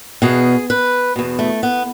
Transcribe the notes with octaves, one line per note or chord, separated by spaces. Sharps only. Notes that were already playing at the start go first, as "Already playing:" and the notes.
E2 B2 G#4
B4
E2 B2
A3
B3